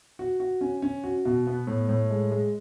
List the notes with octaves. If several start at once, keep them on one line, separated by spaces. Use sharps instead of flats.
F#4
F#4
C#4
C#4
F#4
B2
B3
A2
A2
G#3
G#3